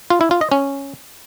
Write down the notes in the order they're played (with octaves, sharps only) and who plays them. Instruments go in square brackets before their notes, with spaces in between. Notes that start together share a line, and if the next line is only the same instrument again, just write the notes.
[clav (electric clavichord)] F4
E4
F4
D#5
C#4